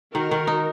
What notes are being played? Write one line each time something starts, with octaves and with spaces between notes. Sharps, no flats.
D#3 F#4 A#4
D#3
D#4